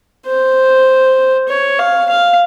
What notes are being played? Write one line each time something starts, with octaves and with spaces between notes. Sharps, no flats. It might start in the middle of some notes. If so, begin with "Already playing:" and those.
C5
C#5
F5
F5